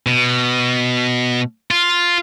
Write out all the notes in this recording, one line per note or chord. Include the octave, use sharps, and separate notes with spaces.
B2
F4